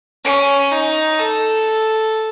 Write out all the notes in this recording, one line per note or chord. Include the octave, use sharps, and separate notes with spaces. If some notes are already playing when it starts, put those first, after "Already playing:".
C#4
D#4
A4